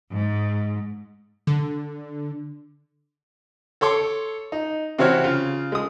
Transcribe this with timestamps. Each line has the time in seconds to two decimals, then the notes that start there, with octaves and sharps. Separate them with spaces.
0.14 G#2
1.47 D3
3.81 A4 C#5 C6 D6
4.52 D#4
4.99 C3 E3 F#4 C5 C#5 F6
5.24 C#3 F4
5.72 G#3 D#6